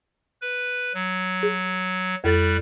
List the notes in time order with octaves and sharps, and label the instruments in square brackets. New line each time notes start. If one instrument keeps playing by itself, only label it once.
[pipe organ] B4
F#3
[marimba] G#4
[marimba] F2 A4 A6 [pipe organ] G3 F#6